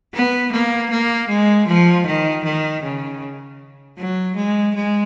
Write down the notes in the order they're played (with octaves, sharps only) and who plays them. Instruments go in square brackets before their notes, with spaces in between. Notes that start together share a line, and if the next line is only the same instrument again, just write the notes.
[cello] B3
A#3
A#3
G#3
F3
D#3
D#3
C#3
F#3
G#3
G#3